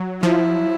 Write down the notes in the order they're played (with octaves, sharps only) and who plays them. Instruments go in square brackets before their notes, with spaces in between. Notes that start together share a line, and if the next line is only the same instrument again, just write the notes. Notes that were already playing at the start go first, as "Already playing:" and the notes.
Already playing: [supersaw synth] F#3
[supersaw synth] F3 [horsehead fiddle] E4